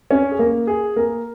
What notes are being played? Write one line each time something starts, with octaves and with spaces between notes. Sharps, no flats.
C#4 C#5
G#4
A#3 A#4
G#4
A#3 A#4